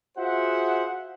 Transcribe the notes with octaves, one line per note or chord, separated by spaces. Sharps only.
F4 F#4 G#4 C5 E5 F#5